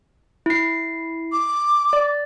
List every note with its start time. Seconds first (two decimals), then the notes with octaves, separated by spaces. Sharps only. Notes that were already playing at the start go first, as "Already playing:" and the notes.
0.46 E4 C7
1.32 D6
1.93 D5